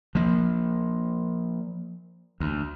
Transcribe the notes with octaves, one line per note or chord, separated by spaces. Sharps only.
F3 A#3
D2